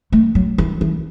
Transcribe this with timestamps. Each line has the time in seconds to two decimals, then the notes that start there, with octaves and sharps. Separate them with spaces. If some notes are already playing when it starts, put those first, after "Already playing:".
0.12 A3
0.35 F#3
0.58 E3
0.81 E3